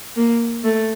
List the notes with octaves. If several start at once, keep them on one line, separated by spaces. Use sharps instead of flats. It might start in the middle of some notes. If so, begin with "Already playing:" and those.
A#3
A3